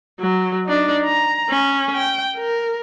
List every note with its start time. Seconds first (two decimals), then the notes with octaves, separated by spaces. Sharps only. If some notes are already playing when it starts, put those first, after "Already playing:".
0.20 F#3
0.66 D4 D#4
1.05 A#5
1.50 C#4
1.96 G5
2.36 A#4